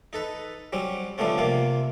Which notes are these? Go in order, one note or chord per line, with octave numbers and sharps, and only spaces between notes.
D#4 A4 B4
F#3 G3 C4 C#4
D3 F3 G3 A3 B3 C#4
C3 A#3 C4 F4